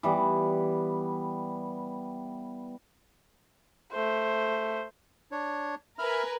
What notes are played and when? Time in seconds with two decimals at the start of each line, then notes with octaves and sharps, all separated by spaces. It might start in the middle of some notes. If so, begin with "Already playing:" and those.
0.03 E3 G3 B3
3.92 A3 C5
5.31 D4 C#5
5.99 A#4 B4 E5 G#5 B5 F6